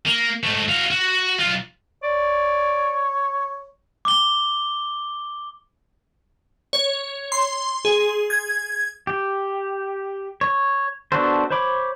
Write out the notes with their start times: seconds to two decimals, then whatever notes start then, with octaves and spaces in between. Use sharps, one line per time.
0.07 A#3
0.43 G#2 A3
0.69 F#4 F5
0.91 F#4
1.39 B1 F4
2.03 C#5 D5
4.05 D6 G7
6.73 C#5
7.32 C6
7.85 G#4
8.30 G#6
9.07 G4
10.41 C#5
11.12 B3 D4 F#4 A4 C5
11.50 C5 C#5 B5 D6